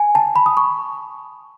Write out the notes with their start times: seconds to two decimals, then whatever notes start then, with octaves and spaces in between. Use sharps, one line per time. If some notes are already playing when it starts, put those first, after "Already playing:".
Already playing: G#5
0.15 A5
0.36 B5
0.46 D#6
0.57 C#6